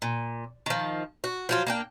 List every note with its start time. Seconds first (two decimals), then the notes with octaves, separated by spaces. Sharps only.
0.02 A#2
0.66 D#3 F3
1.24 F#4
1.49 F3 F#3 F4
1.67 A#3 D4 G5